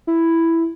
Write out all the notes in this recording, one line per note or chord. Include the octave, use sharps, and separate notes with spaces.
E4